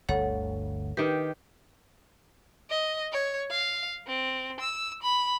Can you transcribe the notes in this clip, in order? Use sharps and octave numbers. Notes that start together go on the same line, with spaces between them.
G1 D2 A4 C#5 F#5
D#3 G4 B4
D#5
C#5
F5
C4
E6
B5